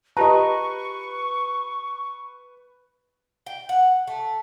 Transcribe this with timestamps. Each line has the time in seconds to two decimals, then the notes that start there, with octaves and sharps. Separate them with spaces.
0.17 F4 G4 B4 D#5 A5 A#5 C#6
3.46 G5
3.69 F#5
4.07 A3